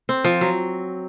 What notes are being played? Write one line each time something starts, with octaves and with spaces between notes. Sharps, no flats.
C4
F3
F#3